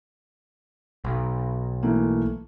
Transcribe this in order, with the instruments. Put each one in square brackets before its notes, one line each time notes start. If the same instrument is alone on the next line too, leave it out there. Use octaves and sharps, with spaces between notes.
[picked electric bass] B1
[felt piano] E3 A3 A#3